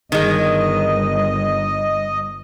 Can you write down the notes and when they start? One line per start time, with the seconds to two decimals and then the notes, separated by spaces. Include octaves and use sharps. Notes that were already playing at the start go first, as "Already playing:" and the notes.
0.12 G1 D#3 G#3 D#5